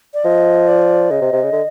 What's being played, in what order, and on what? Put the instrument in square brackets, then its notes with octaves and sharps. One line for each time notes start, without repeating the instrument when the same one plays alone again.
[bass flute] D5
[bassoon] F3 [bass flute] D#5
[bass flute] D5
[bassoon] C#3 [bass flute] D#5
[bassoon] C3
C3
C#3
D3